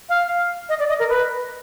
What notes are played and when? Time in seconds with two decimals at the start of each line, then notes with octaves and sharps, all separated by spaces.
0.09 F5
0.69 D#5
0.79 D5
0.89 D#5
0.99 A#4
1.09 B4